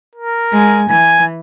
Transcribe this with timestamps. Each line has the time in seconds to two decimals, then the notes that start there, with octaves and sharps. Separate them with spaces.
0.15 A#4
0.52 G#3 G#5
0.90 E3 G#5